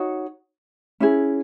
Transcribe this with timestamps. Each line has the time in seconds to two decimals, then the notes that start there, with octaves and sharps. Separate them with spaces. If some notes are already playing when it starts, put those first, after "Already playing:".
Already playing: D#4 F#4 C#5
1.00 C#4 E4 G#4